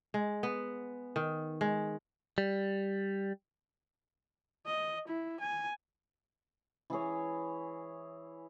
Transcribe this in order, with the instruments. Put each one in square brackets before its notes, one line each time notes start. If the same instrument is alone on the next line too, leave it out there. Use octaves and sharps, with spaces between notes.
[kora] G#3
B3
D#3
G#3
[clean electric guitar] G3
[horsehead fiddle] D#5
E4
G#5
[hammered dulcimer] E3 E4 G#4 C#5